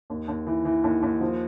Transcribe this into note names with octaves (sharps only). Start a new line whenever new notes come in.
D#2
D#2
E3
E3
D#2
D#2
F3